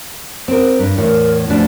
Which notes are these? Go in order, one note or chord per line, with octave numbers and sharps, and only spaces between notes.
C4 A#4
G2
E2 A2 A#4
F2 B2 A3 D4